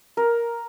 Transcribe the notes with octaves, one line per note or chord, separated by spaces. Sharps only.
A#4